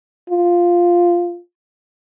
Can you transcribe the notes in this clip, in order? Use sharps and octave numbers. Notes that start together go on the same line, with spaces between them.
F4